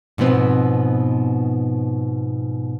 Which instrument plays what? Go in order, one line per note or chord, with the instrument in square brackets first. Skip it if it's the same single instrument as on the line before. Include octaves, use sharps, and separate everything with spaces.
[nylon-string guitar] G#2 B2 F3 B3 C4